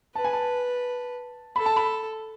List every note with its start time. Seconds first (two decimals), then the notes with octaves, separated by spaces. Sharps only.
0.15 B4 A5
0.25 G#5
0.33 A5
1.56 A4 B5
1.66 A5
1.76 B5